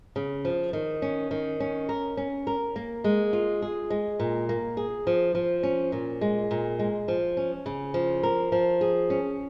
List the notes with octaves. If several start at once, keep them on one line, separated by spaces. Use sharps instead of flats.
C#3
F3
D#3
C#4
D#3
C#4
A#4
C#4
A#4
A#3
G#3
F4
G#4
G#3
A#2
A#3
G#4
F3
F3
C#4
A#2
G#3
A#2
G#3
F3
C#4
C#3
F3
A#4
F3
G#4
C#4